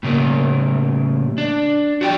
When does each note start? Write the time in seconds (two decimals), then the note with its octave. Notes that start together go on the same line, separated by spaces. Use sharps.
0.03 A2 C#3 A#3
1.38 D4
2.01 F#4 D5 G5